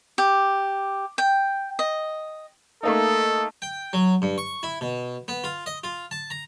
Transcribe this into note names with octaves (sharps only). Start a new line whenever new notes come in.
G4
G5
D#5
A3 A#3 D#4 A4
G5
F#3
G2
C#6
E4
B2
B3
F4
D#5
F4
A5
A#5